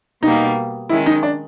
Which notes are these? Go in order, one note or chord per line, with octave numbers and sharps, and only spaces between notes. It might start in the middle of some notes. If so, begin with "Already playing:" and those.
B2 G3 A#3 D#4
D#3 G#3 C#4 E4
D#4
D4